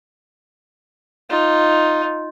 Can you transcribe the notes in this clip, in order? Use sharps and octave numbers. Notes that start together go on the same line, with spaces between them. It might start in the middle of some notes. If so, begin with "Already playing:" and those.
D#4 F4